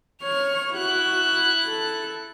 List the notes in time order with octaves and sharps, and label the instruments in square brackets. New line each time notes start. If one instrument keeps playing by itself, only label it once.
[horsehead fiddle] C#5 [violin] F6
[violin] E4 F#6 [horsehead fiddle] F#4
[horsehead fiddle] A4